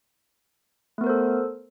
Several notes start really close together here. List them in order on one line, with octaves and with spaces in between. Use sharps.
A3 B3 A#4 C5 A4